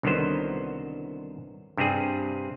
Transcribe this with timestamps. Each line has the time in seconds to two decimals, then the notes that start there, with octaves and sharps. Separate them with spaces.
0.03 C2 D3 D#3 F#3 B3 C5
1.77 G2 C3 G3 C4 G#4